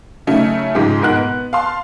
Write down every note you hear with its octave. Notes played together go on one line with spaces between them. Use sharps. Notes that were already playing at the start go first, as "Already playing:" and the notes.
C#3 F#3 A3 C#4 D#4
G#2 C#3 F3 G#3 G4
G#2 B2 A#4 F#5 F#6
B3
F5 A5 C6